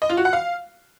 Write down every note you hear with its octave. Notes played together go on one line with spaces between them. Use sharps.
D#5
F4
F#4
F#5
F5